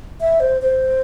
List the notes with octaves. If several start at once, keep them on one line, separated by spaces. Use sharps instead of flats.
E5
C5
C5